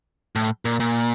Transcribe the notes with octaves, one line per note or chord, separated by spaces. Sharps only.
A2
A#2
A#2